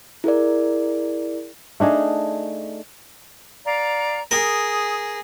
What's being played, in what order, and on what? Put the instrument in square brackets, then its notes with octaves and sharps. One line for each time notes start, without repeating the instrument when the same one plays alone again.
[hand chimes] E4 G#4 A#4 D5
[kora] A3 D4 D#4 G#4
[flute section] D5 F5 A#5
[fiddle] G#4 [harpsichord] A#4 [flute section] D#6